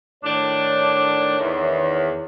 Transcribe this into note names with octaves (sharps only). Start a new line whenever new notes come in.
A2 D#3 D4 C#5
E2